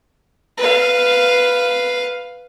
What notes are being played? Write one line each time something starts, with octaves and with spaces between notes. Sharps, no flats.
B4 F5